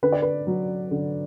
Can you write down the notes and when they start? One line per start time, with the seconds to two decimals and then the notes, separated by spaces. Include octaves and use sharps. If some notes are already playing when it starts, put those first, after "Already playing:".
0.03 D3 B4
0.12 D5
0.22 B4
0.47 F#3
0.91 D3